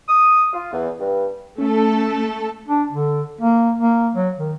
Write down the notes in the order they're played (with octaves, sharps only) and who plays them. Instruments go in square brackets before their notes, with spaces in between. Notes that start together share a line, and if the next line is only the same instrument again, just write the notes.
[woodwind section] D#6
F4
E2
G2
[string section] A3 A4 [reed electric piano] C#4
[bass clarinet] D4
D3
A#3
A#3
F#3
D#3